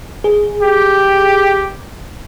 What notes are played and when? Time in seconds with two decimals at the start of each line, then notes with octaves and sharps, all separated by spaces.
0.24 G#4
0.62 G4